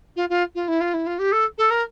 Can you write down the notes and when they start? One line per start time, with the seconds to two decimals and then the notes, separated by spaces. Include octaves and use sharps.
0.16 F4
0.29 F4
0.55 F4
0.68 E4
0.81 F4
0.94 E4
1.06 F4
1.19 G4
1.32 A4
1.58 A4
1.70 A#4